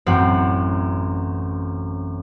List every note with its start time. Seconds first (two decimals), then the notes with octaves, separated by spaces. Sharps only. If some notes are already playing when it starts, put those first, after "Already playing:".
0.06 A1 F#2 C4 F#5